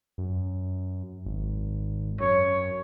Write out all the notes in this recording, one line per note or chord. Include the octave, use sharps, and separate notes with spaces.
F#2
G#1
F#2 C#5